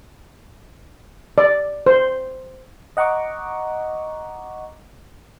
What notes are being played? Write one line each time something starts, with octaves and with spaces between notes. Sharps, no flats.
D5
C5
D#5 F#5 A#5 C#6 D6